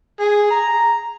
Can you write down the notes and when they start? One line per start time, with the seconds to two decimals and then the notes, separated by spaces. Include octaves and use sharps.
0.20 G#4
0.51 A#5